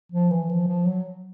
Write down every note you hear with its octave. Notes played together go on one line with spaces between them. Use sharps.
F3
E3
F3
F3
F#3